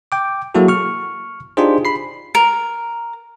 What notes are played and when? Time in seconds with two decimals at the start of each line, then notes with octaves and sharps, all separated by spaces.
0.12 G5 D6
0.55 F#3 A#3 E4 F#4 G#4 A4
0.68 C#6 F6
1.57 D4 D#4 F4 G4 G#4 C5
1.85 B5 C7
2.35 A#4